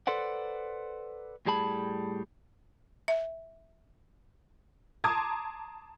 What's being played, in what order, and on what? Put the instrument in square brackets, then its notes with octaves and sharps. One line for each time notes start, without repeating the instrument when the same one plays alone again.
[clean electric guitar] A4 B4 C5 D5 F#5
A2 G3 G#4 A5 B5
[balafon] E5
[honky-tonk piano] A5 A#5 C6 D6 D#6 G#6